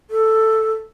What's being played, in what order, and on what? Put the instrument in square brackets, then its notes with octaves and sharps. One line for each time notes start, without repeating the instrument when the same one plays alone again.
[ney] A4